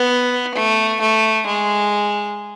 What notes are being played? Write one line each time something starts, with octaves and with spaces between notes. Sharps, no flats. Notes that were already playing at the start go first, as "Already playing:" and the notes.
Already playing: B3
A3
A3
G#3